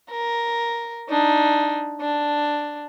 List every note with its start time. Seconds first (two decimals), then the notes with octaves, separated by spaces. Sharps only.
0.10 A#4
1.09 D4 D#4
2.01 D4